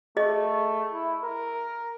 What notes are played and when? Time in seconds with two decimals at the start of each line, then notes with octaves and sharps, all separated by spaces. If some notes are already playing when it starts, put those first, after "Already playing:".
0.17 A3 G#4 D#5 C#6
0.93 E4
1.23 A#4